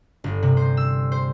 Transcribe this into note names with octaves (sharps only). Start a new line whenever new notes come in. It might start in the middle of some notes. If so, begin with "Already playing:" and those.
G1
C3
C5
E6
C5